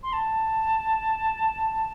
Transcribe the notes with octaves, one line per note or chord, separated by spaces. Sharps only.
C6
A5